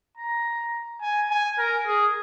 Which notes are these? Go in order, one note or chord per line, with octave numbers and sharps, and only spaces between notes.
A#5
G#5
G#5
A#4
G#4